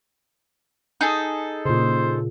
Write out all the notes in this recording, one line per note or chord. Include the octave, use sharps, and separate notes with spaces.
D#4 G#4 A4
A#2 C#3 C5